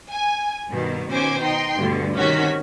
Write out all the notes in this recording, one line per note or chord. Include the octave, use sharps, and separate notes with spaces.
G#5
G2 B2 D#3
B2 D#3 C#4 C5 G#5 D6
D#4 G5 C6
D2 G2 B2 D3
C3 D#3 C#4 F#4 B6